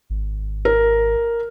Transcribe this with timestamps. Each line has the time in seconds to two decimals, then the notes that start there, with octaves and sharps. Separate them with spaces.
0.10 G#1
0.65 A#4